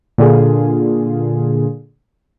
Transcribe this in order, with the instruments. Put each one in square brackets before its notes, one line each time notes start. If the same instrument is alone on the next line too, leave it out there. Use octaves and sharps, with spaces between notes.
[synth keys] A#2 D3 F4 G#4